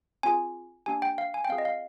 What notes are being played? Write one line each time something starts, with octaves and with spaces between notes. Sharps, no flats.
C4 F4 G#4 G#5
A#3 D4 G4 G#5
G5
F5
G#5
G5
C4 F4 G#4 F5
D#5
F5